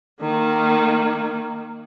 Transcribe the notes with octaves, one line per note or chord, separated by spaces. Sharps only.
D#3 A#3